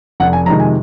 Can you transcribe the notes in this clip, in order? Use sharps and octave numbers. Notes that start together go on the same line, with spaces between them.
F1 F#5
G#5
F2 C3 D#3 G#3 A#5
G#5